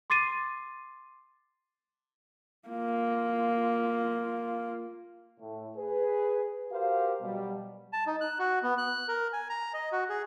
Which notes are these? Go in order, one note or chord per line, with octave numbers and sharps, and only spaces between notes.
C6 D6 A6 C7 D#7
A#3 F4
A2
G#4 B4
F#4 G4 A#4 C5 F5
B2 F#3 G3
A5
D#4
F#6
F#4
B3
F#6
A#4
G#5
A#5
D#5
F#4
G#4